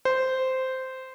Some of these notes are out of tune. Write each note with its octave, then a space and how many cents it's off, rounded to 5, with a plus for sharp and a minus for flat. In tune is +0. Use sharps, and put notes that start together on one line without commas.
C5 -10